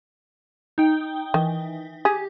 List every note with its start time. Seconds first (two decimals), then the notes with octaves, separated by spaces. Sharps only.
0.78 D#4 G5
1.34 D#3 E3
2.05 G4 G#4